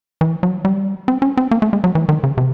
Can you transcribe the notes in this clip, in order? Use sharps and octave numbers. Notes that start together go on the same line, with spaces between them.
E3
F#3
G3
C4
C#4
C4
A#3
A3
G#3
F#3
E3
D#3
C#3
C3